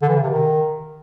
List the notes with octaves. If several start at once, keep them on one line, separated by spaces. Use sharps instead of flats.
D3
E3
C#3
C3
D#3